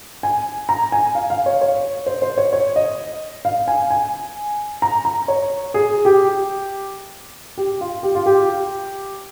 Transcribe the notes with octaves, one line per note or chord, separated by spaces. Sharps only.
G#5
A#5
G#5
F5
F5
C#5
C#5
C5
C5
C#5
C#5
D#5
F5
G#5
G#5
A#5
A#5
C#5
G#4
G4
G4
F4
G4
F4
G4